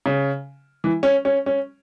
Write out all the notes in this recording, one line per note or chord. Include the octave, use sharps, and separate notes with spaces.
C#3
E3
C#4
C#4
C#4